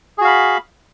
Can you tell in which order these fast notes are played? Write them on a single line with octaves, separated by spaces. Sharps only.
G#4 F#4 F5 B5